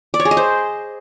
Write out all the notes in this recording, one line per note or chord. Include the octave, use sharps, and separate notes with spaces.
D5
C#5
G#4
D#5
C5